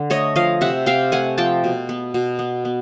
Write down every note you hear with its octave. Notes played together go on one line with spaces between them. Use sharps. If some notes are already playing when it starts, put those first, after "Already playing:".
Already playing: D3
A3 C#5 D#5
F3 D#5 F5
C3 E5 F#5
C3 F5 G5
A3 F#5 G#5
F3 G5 A5
B2
B3
B2
B3
B3